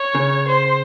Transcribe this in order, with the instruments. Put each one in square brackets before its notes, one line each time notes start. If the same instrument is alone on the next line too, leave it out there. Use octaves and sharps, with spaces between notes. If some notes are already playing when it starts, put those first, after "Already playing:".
Already playing: [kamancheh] C#5
[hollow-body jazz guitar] C#3
[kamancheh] C5